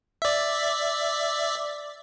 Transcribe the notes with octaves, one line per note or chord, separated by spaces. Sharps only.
D5 E5